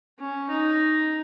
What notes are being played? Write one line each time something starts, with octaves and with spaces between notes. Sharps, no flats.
C#4
D#4